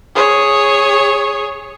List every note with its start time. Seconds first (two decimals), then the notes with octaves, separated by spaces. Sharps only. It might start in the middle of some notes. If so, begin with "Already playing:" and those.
0.16 G#4 C#5